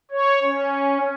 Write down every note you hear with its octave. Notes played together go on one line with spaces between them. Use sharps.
C#5
C#4